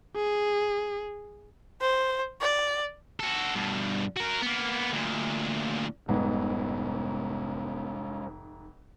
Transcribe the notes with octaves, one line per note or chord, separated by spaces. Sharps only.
G#4
C5
D5
F#4 A4
G2 B2
F#4 A#4
A#3 B3
D2 A#2
F1 G#2 C3 G3 G#3 B3